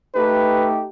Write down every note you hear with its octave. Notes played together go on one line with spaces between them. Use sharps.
A3 D#4 G4 B4